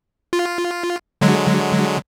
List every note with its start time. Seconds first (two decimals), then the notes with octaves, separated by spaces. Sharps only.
0.33 F4
1.21 D3 F#3 G#3